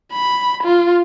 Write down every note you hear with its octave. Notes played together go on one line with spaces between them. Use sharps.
B5
F4